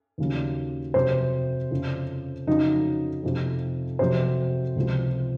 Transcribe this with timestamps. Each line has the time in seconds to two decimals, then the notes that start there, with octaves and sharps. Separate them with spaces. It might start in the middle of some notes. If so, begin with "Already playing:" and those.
0.18 D#2 C#3 F#3
0.94 F2 C3 F#3 C5
1.71 F2 C#3 F3
2.47 F2 C#3 F#3 D#4
3.23 F2 C3 F3
3.99 F2 C3 F#3 C5
4.76 C#2 C3 F3